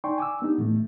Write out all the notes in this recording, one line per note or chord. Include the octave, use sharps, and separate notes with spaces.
D#4 D5 G5 G#5 C6 C#6
G#5 D6 E6
B3 D4 D#4 G4
A2 E3 A3